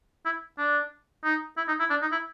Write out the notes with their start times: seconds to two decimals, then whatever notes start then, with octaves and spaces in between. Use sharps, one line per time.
0.26 E4
0.58 D4
1.24 D#4
1.57 E4
1.68 D#4
1.80 E4
1.90 D4
2.02 D#4
2.12 E4